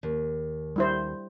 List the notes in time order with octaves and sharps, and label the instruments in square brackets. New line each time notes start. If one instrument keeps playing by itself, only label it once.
[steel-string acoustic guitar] D#2
[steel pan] G3 E4 C5